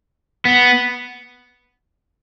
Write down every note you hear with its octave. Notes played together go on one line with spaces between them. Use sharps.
B3